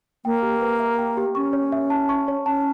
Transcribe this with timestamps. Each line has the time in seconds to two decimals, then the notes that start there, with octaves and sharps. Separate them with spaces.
0.25 A#3 G5
0.42 G4
0.61 B4
0.79 E5
0.98 G5
1.17 G4
1.35 C#4 C#6
1.53 C#5
1.72 E5
1.90 A5
2.09 C#6
2.28 C#5
2.46 C#4 A5